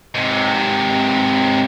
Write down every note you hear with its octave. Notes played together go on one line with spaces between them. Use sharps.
G#2 C3